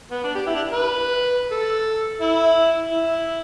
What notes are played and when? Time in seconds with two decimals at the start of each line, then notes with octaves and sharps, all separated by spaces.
0.11 B3
0.24 D4
0.35 G4
0.47 E4
0.55 D4
0.73 B4
1.51 A4
2.21 E4
2.91 E4